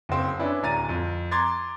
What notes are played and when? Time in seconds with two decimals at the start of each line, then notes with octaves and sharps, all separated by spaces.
0.09 F#1 C4
0.39 C#4 D4 E4 B4
0.63 D1 G#5 A#5 A6 D#7
0.89 F2
1.31 A#5 C6 D6 G#6 A6